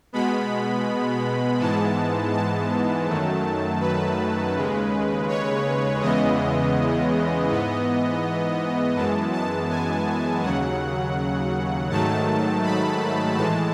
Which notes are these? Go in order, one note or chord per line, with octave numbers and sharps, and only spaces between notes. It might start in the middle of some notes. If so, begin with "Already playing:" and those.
B2 G#3 B3 B5
G#2 E3 G#3 B3 A5
A5
F#2 D#3 F#3 A3
B4
D#2 C#3 G#3
C#5
E2 C#3 E3 G#3 B3 D#5
G#2 E3 B3
F#2 E3 G#3 B3 A5
A5
G#5
D#2 C#3 F#3 F#5
G#2 D#3 F#3 A3 A5
B5
A2 E3 G#3 A5